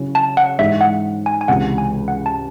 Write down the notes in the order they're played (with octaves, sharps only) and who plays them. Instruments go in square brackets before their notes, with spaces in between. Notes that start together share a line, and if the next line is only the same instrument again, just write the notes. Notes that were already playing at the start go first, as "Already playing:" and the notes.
Already playing: [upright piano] C#3 F#3 C#4 E4
[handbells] A5
F#5
[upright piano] G#2 E3 G#3 D#4 [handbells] E5
[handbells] F#5
G#5
G#5
[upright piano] C#2 C3 E3 [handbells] F#5
[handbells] G#5
F#5
A5